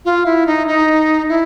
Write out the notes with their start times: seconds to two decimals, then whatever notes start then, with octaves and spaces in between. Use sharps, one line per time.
0.05 F4
0.26 E4
0.47 D#4
0.67 D#4
1.29 E4